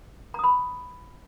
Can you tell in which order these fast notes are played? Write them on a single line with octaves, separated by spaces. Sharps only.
A#5 D#6 B5